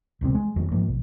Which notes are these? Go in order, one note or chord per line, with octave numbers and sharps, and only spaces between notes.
D1 C2 C3 C4
G#3
F2 D#3 F#3
G#2 F3 A#3
B1